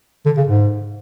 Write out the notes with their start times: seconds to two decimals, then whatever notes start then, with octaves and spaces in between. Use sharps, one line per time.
0.26 D3
0.37 C#3
0.47 G#2